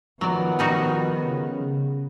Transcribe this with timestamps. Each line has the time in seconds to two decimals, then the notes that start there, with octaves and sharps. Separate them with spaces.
0.21 D#3 F3 F#3 B3 D5
0.59 G3 D#4 F#4
1.24 C#3